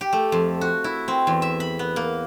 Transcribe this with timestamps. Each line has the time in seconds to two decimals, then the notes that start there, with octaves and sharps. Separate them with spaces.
0.01 G4
0.13 A3
0.32 F2
0.61 F#4
0.84 E4
1.08 C4
1.27 E2
1.42 E5
1.60 B5
1.79 B3
1.96 A#3